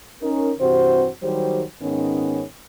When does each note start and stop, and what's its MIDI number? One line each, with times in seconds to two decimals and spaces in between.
0.22 0.51 61
0.22 0.51 63
0.22 0.51 70
0.60 1.08 43
0.60 1.08 48
0.60 1.08 52
0.60 1.08 60
0.60 1.08 66
0.60 1.08 72
1.22 1.63 51
1.22 1.63 54
1.22 1.63 55
1.22 1.63 67
1.22 1.63 72
1.81 2.43 44
1.81 2.43 51
1.81 2.43 59
1.81 2.43 61